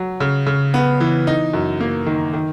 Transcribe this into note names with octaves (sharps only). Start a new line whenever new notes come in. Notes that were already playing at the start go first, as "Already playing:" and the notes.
Already playing: F#3
C#3
C#3
B3
E3
D#4
F#2
A#3
D#3
D#3